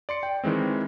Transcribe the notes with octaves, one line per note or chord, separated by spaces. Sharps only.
D5 C6 C#7
G5
D#3 E3 G#3 C4